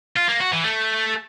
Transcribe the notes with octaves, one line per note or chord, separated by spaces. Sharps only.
F4
A#3
F#4
E3
A3